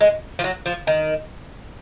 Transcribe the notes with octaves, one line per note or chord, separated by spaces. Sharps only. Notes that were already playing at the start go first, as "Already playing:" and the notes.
G#3
F3
F#3
F3
D#3